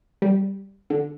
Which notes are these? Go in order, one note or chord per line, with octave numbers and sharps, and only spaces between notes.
G3
D3